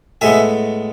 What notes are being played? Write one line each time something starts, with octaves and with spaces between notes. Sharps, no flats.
A2 G#3 B3 E5 G#5